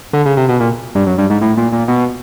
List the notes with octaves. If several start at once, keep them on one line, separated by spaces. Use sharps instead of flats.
D3
C#3
C3
B2
A#2
G2
F#2
G2
G#2
A2
A#2
A#2
B2